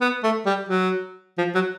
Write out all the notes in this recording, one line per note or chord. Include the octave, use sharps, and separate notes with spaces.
B3
A3
G3
F#3
F3
F#3